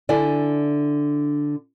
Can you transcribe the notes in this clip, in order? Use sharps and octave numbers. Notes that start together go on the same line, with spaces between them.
D3 D4 E4 G#5